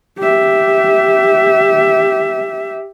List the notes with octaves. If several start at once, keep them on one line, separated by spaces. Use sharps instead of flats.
G4 E5